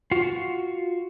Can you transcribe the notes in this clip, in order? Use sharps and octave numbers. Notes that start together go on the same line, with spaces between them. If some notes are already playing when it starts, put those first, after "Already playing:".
F4 F#4